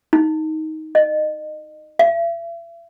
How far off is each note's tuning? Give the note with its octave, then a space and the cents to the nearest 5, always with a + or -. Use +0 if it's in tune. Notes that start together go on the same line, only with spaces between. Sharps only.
D#4 +15
D#5 -30
E5 +40